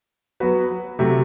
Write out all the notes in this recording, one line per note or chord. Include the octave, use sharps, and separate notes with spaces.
F#3 B3 F#4 B4
C3 F#3 A3